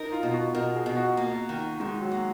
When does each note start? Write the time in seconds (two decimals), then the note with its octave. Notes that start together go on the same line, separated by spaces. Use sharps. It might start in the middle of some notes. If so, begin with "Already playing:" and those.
Already playing: D#4 A#4
0.12 F4
0.23 B2
0.34 F#4
0.54 B2 A#4
0.75 G#4
0.86 B2
0.97 F#4
1.17 A#3
1.49 D#3
1.80 D#3 G#3
2.01 F#3
2.11 A#3